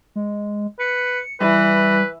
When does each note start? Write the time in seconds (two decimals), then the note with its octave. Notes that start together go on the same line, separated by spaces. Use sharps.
0.16 G#3
0.80 B4 C#7
1.41 E3 G3 B4